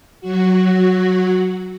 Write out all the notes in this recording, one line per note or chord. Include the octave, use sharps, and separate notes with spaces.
F#3 F#4